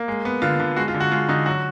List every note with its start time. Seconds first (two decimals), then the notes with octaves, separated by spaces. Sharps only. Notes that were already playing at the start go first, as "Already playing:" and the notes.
Already playing: A#3
0.08 G#3
0.25 B3
0.42 D3 F4
0.60 D3
0.76 G#3 F#4
0.88 F4
0.94 D3
1.00 F#4
1.12 G#3 F4
1.28 D3 D#4
1.46 F#3 F#4